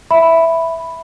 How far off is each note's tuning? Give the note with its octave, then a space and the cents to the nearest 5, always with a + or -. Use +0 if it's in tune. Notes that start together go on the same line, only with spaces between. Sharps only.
E5 +0 B5 +0